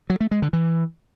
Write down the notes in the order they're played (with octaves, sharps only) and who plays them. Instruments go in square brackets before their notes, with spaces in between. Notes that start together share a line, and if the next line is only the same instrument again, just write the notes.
[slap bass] F#3
A3
G#3
D3
E3